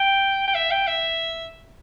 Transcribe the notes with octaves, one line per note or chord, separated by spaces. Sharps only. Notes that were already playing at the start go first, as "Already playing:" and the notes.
Already playing: G5
G5
E5
G5
E5